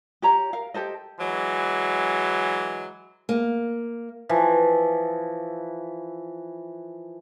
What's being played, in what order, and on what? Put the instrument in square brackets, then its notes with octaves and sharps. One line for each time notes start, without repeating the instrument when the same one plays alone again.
[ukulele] G4 C#5 A#5
A#4 F5
G4 A4 C5 D#5
[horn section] E3 F#3 G#3
[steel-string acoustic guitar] A#3
[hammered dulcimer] E3 F3